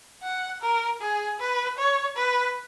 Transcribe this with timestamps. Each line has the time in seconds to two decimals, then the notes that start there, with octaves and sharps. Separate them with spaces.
0.23 F#5
0.62 A#4
1.01 G#4
1.40 B4
1.78 C#5
2.16 B4